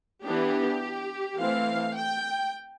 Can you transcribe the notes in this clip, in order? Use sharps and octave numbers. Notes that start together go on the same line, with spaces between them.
E3 B3 D4 G4
E3 A3 C4 F5
G5